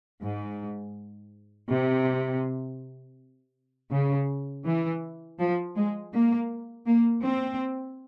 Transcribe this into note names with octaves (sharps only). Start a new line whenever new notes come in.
G#2
C3
C#3
E3
F3
G#3
A#3
A#3
C4